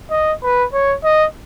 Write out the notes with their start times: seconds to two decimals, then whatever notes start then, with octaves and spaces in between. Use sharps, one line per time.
0.11 D#5
0.43 B4
0.73 C#5
1.04 D#5